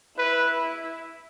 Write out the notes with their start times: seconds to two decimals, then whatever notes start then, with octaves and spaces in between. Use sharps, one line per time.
0.18 E4 B4